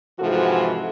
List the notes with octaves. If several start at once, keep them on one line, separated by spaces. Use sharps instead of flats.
G#2 C3 E3 F3 F#4 A4